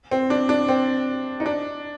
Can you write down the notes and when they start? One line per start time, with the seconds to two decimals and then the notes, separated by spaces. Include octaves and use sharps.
0.11 C4
0.30 D4
0.49 D4
0.68 C4
1.40 D#4
1.46 D4